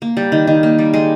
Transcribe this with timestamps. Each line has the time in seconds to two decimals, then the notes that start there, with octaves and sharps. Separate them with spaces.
0.02 A#3
0.17 G3
0.32 D#3
0.47 D#3
0.63 A#3
0.79 G3
0.94 G#3